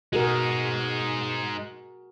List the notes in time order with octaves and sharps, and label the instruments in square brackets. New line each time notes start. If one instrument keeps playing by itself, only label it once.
[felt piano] B2 [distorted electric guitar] G#3 D#4 [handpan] F#4 G#4 A#4